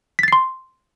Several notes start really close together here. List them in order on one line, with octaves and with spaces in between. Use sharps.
B6 A6 C7 C6